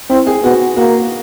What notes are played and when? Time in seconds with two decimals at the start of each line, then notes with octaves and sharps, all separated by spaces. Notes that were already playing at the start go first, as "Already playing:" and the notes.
0.10 C4 E4
0.27 G#4
0.43 B3 F#4
0.76 A#3 F#4